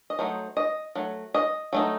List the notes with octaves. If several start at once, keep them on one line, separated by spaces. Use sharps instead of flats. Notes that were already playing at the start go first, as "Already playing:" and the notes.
D#5
F#3 A3 D#4 C5
D#5
F#3 A3
D#5
F#3 A3 D#4